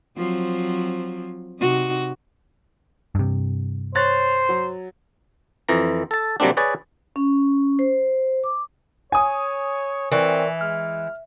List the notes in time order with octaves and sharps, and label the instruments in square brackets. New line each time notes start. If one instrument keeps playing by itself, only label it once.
[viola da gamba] F3 F#3 C4
C3 D#4 F#4
[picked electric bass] G2 C3
[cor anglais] C5 [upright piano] C#5 F#6 A6
[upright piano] F#3
[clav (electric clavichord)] F2 E3 A#5
A4 A5
C3 F#3 G3 A#3 C4 D4
G#4 B4 C#5 D5 G#5
[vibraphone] C#4
C5
D6
[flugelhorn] C#5 [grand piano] G#5 D#6
[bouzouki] E3 [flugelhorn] C4 [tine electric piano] A#4 D5 C#6
[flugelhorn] G#3 [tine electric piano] F6